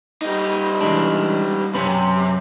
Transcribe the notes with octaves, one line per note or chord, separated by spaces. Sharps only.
G3 D#4
E3 G#3 D4
F#2 C3 C#4 B4